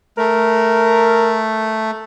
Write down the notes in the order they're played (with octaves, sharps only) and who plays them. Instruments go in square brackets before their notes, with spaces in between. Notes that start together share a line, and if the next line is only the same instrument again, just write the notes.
[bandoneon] A3 [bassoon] A#4